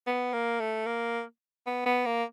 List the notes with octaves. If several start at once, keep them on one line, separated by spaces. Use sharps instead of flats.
B3
A#3
A3
A#3
B3
B3
A#3